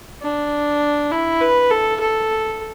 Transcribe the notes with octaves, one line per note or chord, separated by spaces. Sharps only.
D4
E4
B4
A4
A4